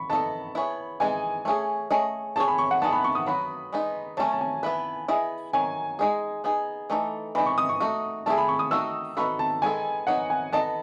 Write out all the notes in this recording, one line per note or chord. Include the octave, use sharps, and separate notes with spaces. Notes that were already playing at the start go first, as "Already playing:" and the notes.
Already playing: B5 C#6
B3 D#4 A4 D#5 A5
B3 E4 G#4 C#5
E3 G#3 D#4 G#5
A3 C#4 G#4
A3 C#4 G#4 D#5
C#4 G#4 C#5 A5
B5
C#6
F#5
B3 D#4 G#4 D#5 A5
B5
C#6
D#6
F#3 B3 F#4 B5
G#3 B3 D#4
F#3 A3 C#4 A5
A5
G#5
B3 E4 B4
B3 E4 G#4 D#5
D#3 F#3 G#5
G#3 D#4 G#4
B3 D#4 G#4
E3 A3 D#4 A4
E3 G#3 D#4 B5
C#6
D#6
C#6
A3 D#4 F#4
A3 E4 G#4 A5
B5
C#6
D#6
D#3 A3 D#4 F#4 E6
B3 D#4 F#4 A4 B5
A5
D#3 G#3 B3 F#4 A4 G#5
F#3 B3 D#4 F#5
G#5
B3 D#4 A4 D#5 A5